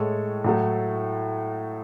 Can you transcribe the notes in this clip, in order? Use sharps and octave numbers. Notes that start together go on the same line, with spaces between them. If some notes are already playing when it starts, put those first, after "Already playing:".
Already playing: A2 G#3 A4 C#5
A2 F#3 A3